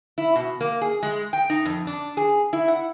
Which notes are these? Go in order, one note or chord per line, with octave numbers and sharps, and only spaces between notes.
E4
B2
A#3
G#4
G#3
G5
D#4
F2
D4
G#4
E4
F#5